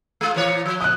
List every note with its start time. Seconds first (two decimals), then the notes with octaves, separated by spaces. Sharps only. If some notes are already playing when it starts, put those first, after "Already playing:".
0.21 G#3 F4
0.34 A#2 E3 C#5
0.66 F3
0.81 D#6 F#6